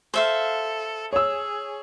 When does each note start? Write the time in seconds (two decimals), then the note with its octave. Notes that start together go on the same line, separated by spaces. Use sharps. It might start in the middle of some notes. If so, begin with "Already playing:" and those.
0.14 A4 C5 E5 F5
1.13 G#4 C#5 E6